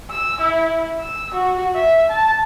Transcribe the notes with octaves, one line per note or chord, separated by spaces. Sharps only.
E6
E4
E6
F#4
E5
A5